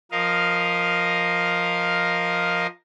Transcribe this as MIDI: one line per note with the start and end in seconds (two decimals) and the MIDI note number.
0.11 2.67 53
0.11 2.67 70
0.11 2.67 75
0.11 2.67 77